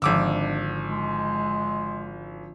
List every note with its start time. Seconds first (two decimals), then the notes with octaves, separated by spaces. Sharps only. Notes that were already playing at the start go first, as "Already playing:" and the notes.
0.02 G#1 D3 F3 D4 D6 E6
0.88 G#3